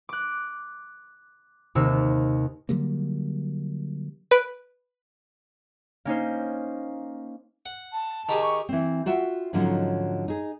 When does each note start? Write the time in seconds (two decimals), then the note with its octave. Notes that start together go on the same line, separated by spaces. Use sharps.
0.09 D6 F#6
1.75 D#2 C3 D#3 E6
2.69 D3 F#3 G3 A#3
4.31 B4 D7
6.05 A#3 C#4 D#4 C5
7.66 F#5
7.93 A5
8.29 D#3 G4 G#4
8.43 C#6
8.69 E3 C4
9.06 F4 F#4 E5 G5
9.53 G#2 D3 F3 F#3 C#4 D#4
10.28 D#4 G#4